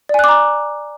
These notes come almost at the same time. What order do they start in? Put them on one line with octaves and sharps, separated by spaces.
D5 G#5 F#6 D6 A#5